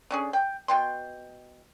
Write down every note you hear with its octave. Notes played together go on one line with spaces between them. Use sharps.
D3 C#4 G#4
G5
B2 G5 C6